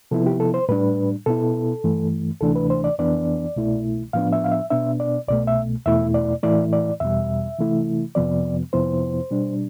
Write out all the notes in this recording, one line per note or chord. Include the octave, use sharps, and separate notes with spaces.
C3 F3 B3 E4 A4
G4
A4
C5
A2 G3 D4 B4
B2 B3 E4 A4
G2 E3 A3
D2 C3 E3 A3 D4 A4
B4
C5
D5
F2 E3 B3 D4 D5
C2 B2 A3 E4
A2 F3 B3 D4 F5
E5
F5
E5
B2 B3 D4 E5
D5
C2 B2 A3 D5
E5
E2 B2 A3 E4 E5
D5
A2 E3 A3 E4 D5
D5
E2 B2 G3 E5
C3 E3 A3 E4
F2 C3 F3 B3 D5
F2 C3 F3 B3 E4 C5
B2 G3 D4